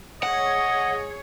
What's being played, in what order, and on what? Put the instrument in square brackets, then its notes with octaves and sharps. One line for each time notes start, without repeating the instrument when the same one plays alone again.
[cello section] G#4 C#5 [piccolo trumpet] D#5 [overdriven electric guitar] F#5